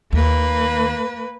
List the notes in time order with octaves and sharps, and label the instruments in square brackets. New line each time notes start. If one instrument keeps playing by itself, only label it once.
[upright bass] D#2 [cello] A#3 B4